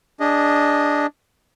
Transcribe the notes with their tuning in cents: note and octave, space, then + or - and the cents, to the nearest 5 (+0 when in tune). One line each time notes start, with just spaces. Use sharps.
D4 -5 G#4 -25 D#5 +0